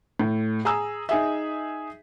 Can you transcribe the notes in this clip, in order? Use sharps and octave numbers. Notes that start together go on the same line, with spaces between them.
A2
G#4 A#5 E6
D#4 G#4 E5